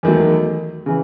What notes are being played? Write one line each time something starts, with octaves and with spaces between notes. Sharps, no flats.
E2 D#3 F#3 A3
C#3 E3